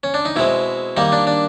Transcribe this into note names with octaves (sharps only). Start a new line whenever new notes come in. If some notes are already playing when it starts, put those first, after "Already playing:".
C#4
D4
D#4
B2 G#3 C4 E4
D#3 G3 A#3 D#4
D4
D4